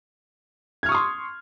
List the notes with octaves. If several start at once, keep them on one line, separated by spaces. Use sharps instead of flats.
C6 C#6 D#6 F6 G#6